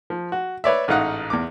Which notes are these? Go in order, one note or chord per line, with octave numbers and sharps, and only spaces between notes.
F3
F#4
B4 C#5 D5 E5
A1 G#2 D#4 F5 F#5
E2 D6